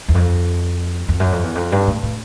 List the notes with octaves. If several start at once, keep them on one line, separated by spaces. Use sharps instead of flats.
E2
F2
F2
F#2
F2
E2
F2
G2
A2
A2